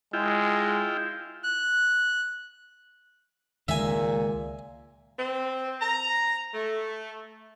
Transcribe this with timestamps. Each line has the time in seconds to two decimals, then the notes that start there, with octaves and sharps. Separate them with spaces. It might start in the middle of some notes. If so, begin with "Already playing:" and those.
0.13 G#3 E4 F4 G5
1.44 F#6
3.68 C#2 A#2 D#3 G#3 E5 G#5
5.18 C4
5.81 A#5
6.54 A3